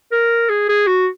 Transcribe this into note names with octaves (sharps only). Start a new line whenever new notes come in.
A#4
G#4
G#4
F#4